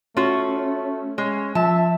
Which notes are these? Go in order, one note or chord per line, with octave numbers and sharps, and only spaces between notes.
A3 C#4 F4 F#4
G#3 C#4
F3 E5 A5